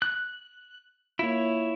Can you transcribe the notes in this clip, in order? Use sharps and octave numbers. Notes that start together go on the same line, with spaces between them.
F#6
A#3 E4 F4 C#5